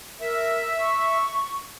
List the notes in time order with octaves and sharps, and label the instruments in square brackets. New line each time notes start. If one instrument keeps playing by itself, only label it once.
[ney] A#4 [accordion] E5
[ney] C#6